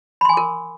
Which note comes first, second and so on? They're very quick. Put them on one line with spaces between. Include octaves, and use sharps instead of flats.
B5 C6 G#5 D6 A#4